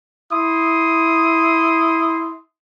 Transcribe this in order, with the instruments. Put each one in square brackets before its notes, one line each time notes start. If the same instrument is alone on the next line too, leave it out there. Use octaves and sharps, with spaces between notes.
[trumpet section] E4 C6 D#6